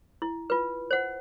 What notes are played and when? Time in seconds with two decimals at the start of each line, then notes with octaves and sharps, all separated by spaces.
0.22 E4
0.50 F4 B4
0.91 C5 F#5